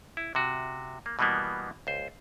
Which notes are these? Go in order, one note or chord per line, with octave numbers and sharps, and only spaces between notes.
E4
C3 F#4
A#3
B2 E3 G3 A#3 B3
C#2 C5